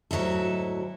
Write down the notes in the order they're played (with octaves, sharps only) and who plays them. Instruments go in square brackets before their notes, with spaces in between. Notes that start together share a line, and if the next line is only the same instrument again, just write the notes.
[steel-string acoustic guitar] D2 G#2 F#3 E4 A4